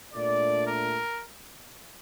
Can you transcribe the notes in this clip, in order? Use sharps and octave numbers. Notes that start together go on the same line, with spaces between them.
A#2 A3 D4 D5
A#4